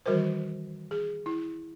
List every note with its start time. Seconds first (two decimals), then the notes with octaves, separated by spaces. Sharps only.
0.06 D#3 E3 G3 F#4 A#4 C5
0.91 G#4
1.26 E4